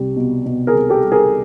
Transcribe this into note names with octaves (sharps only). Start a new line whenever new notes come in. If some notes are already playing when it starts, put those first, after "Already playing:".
Already playing: C2 G3
B2
B2
G#4 A#4
C2
G4 A4
G3
G#4 A#4